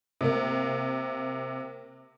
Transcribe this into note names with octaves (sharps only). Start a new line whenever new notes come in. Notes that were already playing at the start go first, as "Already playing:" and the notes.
C3 A#3